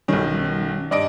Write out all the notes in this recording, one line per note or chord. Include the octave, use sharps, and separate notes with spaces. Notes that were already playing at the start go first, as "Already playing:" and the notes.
B1 D#3 G3 C#4
G2 D5 D#5 D7